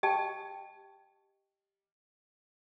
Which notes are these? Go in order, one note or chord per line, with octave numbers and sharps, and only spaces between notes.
G4 D#5 G5 A5